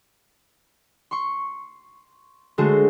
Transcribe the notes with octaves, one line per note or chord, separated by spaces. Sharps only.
C6 C#6
D3 G#3 A3 F#4 C5